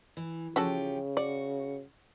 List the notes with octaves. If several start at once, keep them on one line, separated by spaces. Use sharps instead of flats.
E3
C#3 F3 C#4 F#4 G4 A4
F#4 D5